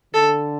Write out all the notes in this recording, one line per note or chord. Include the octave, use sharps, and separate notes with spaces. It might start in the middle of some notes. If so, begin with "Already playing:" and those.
D3 A4